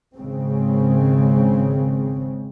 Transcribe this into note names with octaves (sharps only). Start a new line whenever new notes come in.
G#1 C#3 G#3 C4